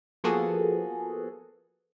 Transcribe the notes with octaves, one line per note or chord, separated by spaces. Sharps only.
F3 A#3 B3 F#4 G#4 A4